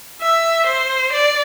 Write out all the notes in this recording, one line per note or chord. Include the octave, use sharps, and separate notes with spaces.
E5
C5
D5